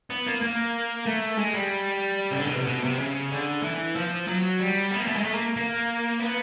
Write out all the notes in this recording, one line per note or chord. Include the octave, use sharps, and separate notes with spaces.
B3
A#3
A#3
A3
G#3
G3
C#3
D3
B2
C3
B2
C3
C#3
D3
E3
F3
F#3
G3
B3
A#3
A3
G#3
A3
A#3
A#3
B3